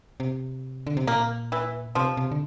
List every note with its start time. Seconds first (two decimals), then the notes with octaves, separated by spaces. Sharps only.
0.20 C3
0.87 D3
0.97 C3
1.07 A#2 A#3
1.52 E3
1.95 C3 F3
2.17 C3
2.32 D3